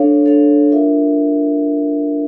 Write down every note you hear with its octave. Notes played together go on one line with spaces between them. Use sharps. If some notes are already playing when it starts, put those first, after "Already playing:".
Already playing: D4 A4 C#5 F5
D4 A4 C#5 F5
D4 F4 A#4 E5